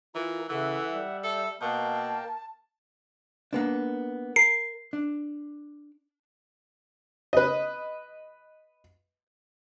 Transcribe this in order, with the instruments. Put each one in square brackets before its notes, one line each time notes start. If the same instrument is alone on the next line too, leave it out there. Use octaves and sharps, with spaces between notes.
[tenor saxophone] E3 [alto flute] F4 [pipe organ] A#4
[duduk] C#3 [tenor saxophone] E3 [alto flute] A4 [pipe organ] E5 F#5
[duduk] G3
[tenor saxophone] A4 [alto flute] E5
[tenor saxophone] B2 [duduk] A#3 [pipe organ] A#4 F5 G5 [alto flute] A5
[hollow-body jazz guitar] A#3 B3 D4
[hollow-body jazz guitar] A#4 [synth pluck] C7
[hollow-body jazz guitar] D4
[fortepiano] B4 D#5